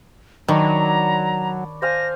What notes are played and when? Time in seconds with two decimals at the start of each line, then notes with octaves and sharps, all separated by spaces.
0.48 D#3 F#3 D4 C#5 A#5 B5
1.82 C5 F5 G#5 A#6